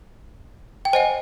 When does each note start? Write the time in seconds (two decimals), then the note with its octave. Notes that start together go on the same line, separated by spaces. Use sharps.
0.85 G5
0.93 C5 D#5 F#5 G#5